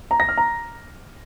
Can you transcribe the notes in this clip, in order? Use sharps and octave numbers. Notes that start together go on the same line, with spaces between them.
A#5
A#6
F6
A#5